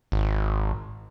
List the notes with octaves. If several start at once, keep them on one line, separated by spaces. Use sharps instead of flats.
G#1